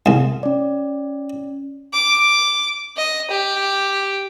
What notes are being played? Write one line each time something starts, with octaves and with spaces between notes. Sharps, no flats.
C2 G#2
C#4 D5
D6
D#5
G4